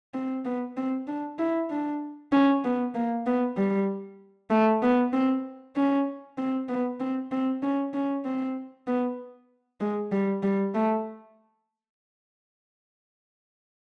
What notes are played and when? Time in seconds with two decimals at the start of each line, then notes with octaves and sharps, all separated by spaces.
0.14 C4
0.45 B3
0.77 C4
1.07 D4
1.38 E4
1.70 D4
2.32 C#4
2.64 B3
2.94 A#3
3.26 B3
3.57 G3
4.50 A3
4.82 B3
5.13 C4
5.76 C#4
6.38 C4
6.68 B3
7.00 C4
7.31 C4
7.62 C#4
7.93 C#4
8.25 C4
8.87 B3
9.80 G#3
10.11 G3
10.43 G3
10.74 A3